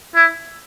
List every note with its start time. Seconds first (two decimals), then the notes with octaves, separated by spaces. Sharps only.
0.15 E4